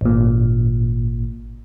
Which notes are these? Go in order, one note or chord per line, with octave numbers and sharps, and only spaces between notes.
G#1 A#2